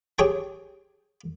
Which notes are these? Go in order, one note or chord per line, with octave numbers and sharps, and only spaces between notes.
G4 G#4 C#5 G5